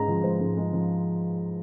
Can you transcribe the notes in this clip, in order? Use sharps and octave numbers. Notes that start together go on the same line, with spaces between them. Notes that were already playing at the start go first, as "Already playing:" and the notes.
Already playing: G#2 G#3 A#5
F3
G#2 C5
G#2
G#3
F3